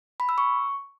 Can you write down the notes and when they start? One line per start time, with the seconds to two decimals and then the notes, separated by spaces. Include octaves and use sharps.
0.20 B5
0.29 E6
0.38 C#6